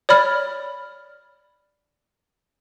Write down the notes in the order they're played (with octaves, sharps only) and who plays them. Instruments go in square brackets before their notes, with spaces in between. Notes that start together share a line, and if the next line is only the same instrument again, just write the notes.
[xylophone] C#5 D5 B5 F6